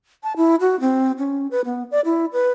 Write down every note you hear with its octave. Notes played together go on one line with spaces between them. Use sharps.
A5
E4
F#4
C4
C#4
B4
B3
D5
E4
B4